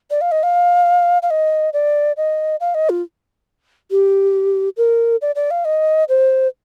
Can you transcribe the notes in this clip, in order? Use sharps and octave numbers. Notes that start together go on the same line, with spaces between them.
D5
F5
D#5
F5
F5
D#5
D5
D#5
F5
D#5
F4
G4
A#4
D5
D5
F5
D#5
C5